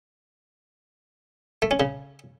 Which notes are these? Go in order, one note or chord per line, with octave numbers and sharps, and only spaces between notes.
A3
C#4
C#3